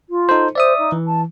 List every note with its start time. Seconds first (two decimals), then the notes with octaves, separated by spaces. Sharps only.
0.09 F4
0.29 D#4 A4 C5
0.55 C5 D5 E5 D#6
0.78 D#4
0.92 E3
1.06 A5